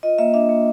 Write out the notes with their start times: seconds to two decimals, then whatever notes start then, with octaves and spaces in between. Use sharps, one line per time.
0.03 F4 D#5
0.18 A#3 E5
0.34 D4 E5
0.49 A#3